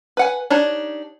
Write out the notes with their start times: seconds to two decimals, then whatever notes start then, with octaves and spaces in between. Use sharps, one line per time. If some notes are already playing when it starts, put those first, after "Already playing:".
0.17 B4 F#5 G#5
0.50 D4 D#4 G4 C#5